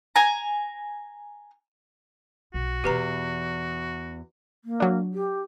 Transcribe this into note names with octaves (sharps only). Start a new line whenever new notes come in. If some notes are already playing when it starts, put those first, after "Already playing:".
G#5 A#5
B1 F#4
E2 B2 D#4 G4 B4 A#5
A#3
F#3 D4
G4